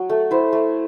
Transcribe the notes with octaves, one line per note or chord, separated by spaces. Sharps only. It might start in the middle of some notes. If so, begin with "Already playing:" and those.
Already playing: F#3
A3
E4 C5
A3